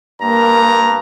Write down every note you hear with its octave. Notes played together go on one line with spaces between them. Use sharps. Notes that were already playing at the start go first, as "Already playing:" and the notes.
G2 A#3 A#5